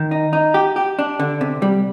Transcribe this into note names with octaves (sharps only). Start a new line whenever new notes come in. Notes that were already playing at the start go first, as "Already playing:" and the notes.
Already playing: D#3
D#4
D#4
G4
G4
D4
D3
C3
G3